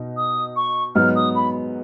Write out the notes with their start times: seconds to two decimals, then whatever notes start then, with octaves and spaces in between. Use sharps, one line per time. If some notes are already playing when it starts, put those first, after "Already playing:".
Already playing: B2 D#4
0.16 D#6
0.56 C#6
0.95 G#2 F#3 B3 D#4 F6
1.15 D#6
1.35 B5